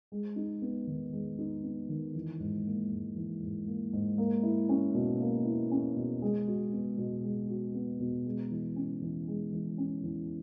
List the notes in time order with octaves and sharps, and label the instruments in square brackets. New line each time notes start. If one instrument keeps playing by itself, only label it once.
[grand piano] G#3
D#4
B3
D#3
G#3
D#4
B3
D#3
E3
G#2
A#3
G#2
E3
G#2
A#3
G#2
A#3
E4
C#4
B2
A#3
E4
C#4
B2
G#3
F#4
B3
B2
G#3
F#4
B3
B2
G#3
E3
C#4
E3
G#3
E3
C#4
E3